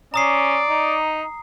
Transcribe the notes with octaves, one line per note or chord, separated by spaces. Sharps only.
C#4 D5 A#5 D#6 C7
D#4